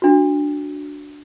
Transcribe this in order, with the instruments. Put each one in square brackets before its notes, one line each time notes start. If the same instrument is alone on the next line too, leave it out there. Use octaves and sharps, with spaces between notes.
[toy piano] D4 F#4